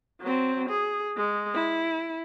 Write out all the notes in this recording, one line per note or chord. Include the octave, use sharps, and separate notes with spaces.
F#3 C4
G#4
G#3
E4